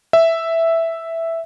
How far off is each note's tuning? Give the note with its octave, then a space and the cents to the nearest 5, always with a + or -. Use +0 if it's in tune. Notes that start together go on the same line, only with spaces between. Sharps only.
E5 +0